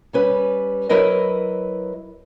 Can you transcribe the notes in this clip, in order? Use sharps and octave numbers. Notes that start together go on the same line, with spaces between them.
G3 C#4 B4
F#3 E4 A#4 B4 D#5